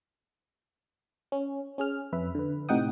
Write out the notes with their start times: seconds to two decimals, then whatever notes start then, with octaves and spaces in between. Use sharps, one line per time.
1.32 C#4
1.78 C#4 G#4 F6
2.12 F2 B4 E5
2.35 D3 B4
2.69 A2 C3 D#4 F#5 G5 D#6